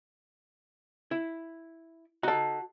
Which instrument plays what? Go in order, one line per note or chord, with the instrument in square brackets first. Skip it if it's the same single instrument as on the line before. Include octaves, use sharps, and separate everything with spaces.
[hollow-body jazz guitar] E4
[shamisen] D#4 A4 [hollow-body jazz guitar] F#4 A5